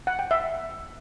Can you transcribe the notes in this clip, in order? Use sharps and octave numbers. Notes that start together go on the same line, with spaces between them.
F#5
G5
E5